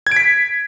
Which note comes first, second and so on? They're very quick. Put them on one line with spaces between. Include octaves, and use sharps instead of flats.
G#6 D7 B6